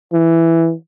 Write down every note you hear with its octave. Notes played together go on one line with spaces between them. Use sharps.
E3